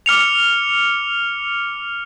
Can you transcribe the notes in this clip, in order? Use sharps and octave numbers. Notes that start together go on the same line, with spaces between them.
D6 F6 C#7 F7